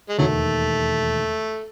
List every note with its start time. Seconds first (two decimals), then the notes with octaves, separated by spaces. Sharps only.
0.09 G#3
0.18 E1 D#2 D#3 F#3 A3